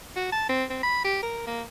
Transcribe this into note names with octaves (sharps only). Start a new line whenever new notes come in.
F#4
A5
C4
C4
B5
G4
A#4
A#3